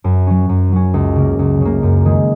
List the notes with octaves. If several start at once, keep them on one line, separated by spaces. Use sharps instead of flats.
F#2
F#3 C#4
F#2
F#3 C#4
C#2
C#3 A#3
C#2
C#3 A#3
F#2
D#3 G#3